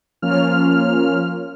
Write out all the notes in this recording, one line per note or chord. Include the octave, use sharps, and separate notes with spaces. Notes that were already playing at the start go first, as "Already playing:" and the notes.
F3 A#3 C#4 F4 F6